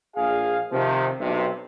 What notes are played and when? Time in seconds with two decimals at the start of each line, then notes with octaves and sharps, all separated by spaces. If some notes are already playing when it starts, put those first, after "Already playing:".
0.16 A#1 G#4 F5
0.72 C3 D#3 F3
1.20 B1 G2 C3